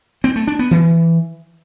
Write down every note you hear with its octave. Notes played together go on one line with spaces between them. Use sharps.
C4
A3
D4
B3
E3